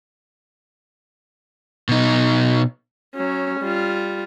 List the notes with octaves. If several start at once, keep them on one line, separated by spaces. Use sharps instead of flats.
B2 D#4
F#3 C#4
G3 F4